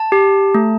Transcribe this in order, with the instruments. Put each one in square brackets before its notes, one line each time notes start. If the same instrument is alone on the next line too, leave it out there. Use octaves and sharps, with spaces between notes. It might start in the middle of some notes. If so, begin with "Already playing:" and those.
Already playing: [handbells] A5
G4
A3